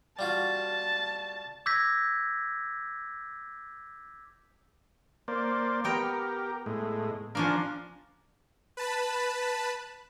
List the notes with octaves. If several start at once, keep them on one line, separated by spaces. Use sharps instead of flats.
G3 F4 F#4 A5
D6 E6 G6 G#6 A#6 B6
A#3 C5 D5
B3 G4 A#4 G5 A#5
A2 G#3
F3 C#4 D4 D5 F5 A#5
B4 A5 B5